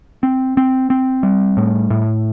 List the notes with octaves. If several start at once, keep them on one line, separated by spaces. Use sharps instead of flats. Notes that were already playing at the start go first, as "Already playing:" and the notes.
C4
C4
C4
G3
A2
A2